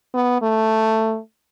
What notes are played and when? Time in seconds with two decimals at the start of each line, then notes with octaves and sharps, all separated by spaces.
0.14 B3
0.42 A3